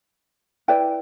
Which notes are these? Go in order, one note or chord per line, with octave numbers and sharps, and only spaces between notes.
E4 B4 D5 G5